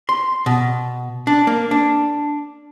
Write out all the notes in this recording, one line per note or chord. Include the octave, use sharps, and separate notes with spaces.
C6
B2
D4
A#3
D4